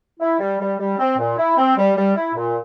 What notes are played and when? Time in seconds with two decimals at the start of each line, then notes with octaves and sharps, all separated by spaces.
0.20 E4
0.39 G3
0.59 G3
0.79 G3
0.98 C4
1.18 A#2
1.37 E4
1.57 C4
1.77 G3
1.96 G3
2.16 E4
2.35 A#2